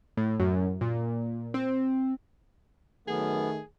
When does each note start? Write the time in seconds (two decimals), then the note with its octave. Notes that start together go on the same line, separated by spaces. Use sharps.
0.17 A2
0.39 F#2
0.81 A#2
1.54 C4
3.08 F#2 D#3 A3 B3 G#4